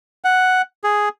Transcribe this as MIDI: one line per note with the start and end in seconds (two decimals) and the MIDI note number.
0.24 0.62 78
0.84 1.09 68